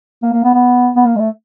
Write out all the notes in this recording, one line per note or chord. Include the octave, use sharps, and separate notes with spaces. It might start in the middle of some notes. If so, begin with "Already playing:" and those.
A#3
A#3
B3
B3
B3
A#3
G#3
A3